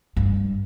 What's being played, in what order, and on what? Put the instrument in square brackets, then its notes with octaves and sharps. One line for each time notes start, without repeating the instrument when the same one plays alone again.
[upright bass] G2